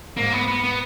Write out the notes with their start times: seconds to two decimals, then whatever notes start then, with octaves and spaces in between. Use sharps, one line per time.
0.16 G#2 A#3
0.33 B3
0.48 B3
0.64 B3